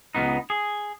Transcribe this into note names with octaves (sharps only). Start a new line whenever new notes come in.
C#2 B3 D#4
G#4